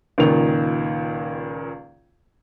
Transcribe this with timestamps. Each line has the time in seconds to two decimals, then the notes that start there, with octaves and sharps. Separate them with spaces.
0.18 C#2 A#2 D#3 F7